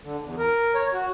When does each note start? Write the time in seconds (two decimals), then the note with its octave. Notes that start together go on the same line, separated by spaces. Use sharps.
0.04 D3
0.24 E2
0.38 A#4
0.75 C#5
0.93 F#4